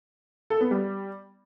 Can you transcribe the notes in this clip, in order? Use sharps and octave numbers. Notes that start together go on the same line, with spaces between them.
A4
B3
G3